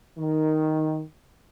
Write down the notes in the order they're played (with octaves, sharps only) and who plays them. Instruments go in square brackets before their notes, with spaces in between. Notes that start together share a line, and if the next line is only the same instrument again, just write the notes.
[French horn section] D#3